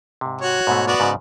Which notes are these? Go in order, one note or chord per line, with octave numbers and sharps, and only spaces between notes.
G#2 C3
F#4 C#5
G#2 B2 A3
B3 F#4 D5
G#2 C#3